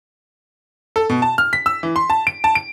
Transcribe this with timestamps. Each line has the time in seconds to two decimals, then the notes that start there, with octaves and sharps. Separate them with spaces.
0.96 A4
1.10 B2
1.22 A5
1.38 F6
1.53 B6
1.66 E6
1.83 E3
1.96 C6
2.10 A5
2.27 D7
2.44 A5
2.55 D7